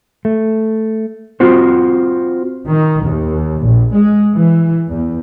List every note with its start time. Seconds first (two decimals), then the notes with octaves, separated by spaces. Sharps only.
0.25 A3
1.40 C4 F4 F#4 C5
2.66 D#3
3.05 D#2
3.62 A#1
3.95 G#3
4.36 E3
4.89 E2